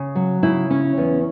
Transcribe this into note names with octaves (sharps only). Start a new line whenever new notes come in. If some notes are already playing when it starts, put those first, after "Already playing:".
Already playing: C#3
F#3
C#3 E4
C#4
E2